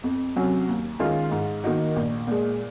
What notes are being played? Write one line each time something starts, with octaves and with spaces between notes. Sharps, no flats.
F2
C3 F#3 C#4 F#4
D#2
D#3 G#3 C#4 F4
G#2
D#3 A#3 D#4 F#4
A#1
A#2 G#3